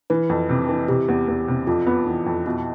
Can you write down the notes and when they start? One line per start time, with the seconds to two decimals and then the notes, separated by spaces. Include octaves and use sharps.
0.10 E3 B4
0.29 F2
0.49 C3
0.69 E3
0.88 C3 G4
1.08 E2
1.28 E2
1.48 C3
1.67 F2 F4
1.87 B3
2.07 E3
2.26 F2
2.46 B2 E4